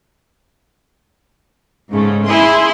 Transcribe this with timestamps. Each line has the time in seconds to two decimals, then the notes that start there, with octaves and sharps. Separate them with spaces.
1.90 G#2 C#3 A3
2.25 E4 G#4 C6